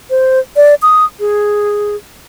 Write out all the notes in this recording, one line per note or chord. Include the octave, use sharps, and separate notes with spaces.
C5
D5
D#6
G#4